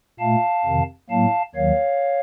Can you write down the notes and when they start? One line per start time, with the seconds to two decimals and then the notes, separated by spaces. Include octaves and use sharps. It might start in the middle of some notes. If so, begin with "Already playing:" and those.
0.19 A#2 A3 F5 A5
0.65 F2 C3 D#3
1.09 A2 F#3 A#3 F5 A5
1.55 D#2 D#3 F#3 C#5 F5